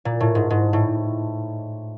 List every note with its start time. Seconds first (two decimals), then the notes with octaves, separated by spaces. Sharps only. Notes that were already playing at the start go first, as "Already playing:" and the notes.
0.05 A#2
0.20 A2
0.35 G#2
0.50 G#2
0.73 A2